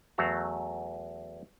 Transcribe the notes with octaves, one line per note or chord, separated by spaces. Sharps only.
E2 F#3 A3 F#4 F5